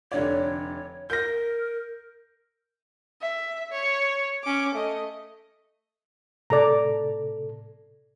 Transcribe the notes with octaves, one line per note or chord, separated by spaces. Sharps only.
F1 D3 C#5 D5
A#4 G6 A#6
E5
C#5
C#4 D6
A3 D#5
A2 C3 A4 D5 A#5